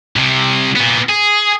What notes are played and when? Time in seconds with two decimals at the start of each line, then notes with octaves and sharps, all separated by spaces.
0.16 C2 C3
0.76 A#2 B3
1.09 G#4